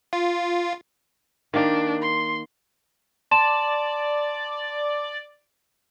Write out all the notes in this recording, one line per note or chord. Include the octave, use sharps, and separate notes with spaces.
F4
D#3 A#3 D4 D#4
C6
D5 A5 C6 E7